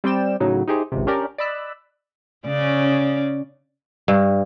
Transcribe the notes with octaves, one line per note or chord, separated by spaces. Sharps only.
G3 C4 D5 G5 E7
A2 C#3 F#3 D#4
D#4 E4 G4 G#4 C5
G#1 C#2 C3
C#4 D4 G4 A#4 D5
D5 D#5 B5 E6 F#6
C#3 C#4 D5
G2